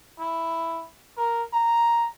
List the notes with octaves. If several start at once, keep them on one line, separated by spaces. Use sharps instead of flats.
E4
A#4
A#5